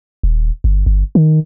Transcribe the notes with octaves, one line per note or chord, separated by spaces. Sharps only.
D#1
G1
G1
D#3